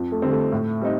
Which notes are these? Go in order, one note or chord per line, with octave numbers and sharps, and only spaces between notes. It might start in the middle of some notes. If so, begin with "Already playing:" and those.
Already playing: F2
A3
D3 G3 C4
A3
A2
G3 C4 D#4